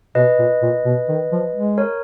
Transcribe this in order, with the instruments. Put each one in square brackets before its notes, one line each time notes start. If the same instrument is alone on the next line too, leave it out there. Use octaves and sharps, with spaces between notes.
[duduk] B2 [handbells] B4 D#5
[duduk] A#2
A#2
B2
D#3
F3
G#3
[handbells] A#4 C#5